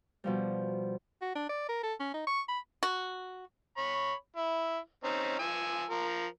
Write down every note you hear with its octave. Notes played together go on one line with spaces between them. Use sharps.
B2 F3 G3
F#4
D4
D5
A#4
A4
C#4
D#4
C#6
B5
F#4
C#5 B5
E4
C4 C#4 D#4
F3 G#5 E6
F3 A#4